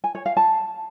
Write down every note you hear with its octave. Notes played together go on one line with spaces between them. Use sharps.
G#5
C#5
F5
A5